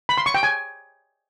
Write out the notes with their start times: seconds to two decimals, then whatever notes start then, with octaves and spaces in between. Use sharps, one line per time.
0.09 B5
0.18 C6
0.26 C#6
0.35 G5
0.43 G#5